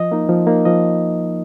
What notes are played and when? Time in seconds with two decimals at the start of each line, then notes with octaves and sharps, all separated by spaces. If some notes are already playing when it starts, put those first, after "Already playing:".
Already playing: F3 D#5
0.12 A#3 D#4
0.29 F3
0.47 A#3 D#4
0.65 F3 D#5